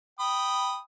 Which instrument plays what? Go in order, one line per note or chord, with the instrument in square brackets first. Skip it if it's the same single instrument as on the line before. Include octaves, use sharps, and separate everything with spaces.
[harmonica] G5 B5 D#6